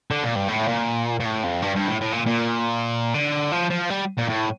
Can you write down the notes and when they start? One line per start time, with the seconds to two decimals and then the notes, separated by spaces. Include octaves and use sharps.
0.11 D3
0.23 A#2
0.36 G2
0.48 A2
0.68 A#2
1.20 A#2
1.25 A2
1.44 F2
1.63 G2
1.76 G2
1.88 A2
2.01 A2
2.13 A#2
2.26 A#2
3.14 D3
3.52 F3
3.71 F3
3.90 G3
4.18 A#2
4.29 A2